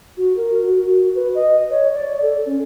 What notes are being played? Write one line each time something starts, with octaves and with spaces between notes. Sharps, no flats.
F#4
A#4
F#4
F#4
B4
D#5
C#5
D5
A4
C#4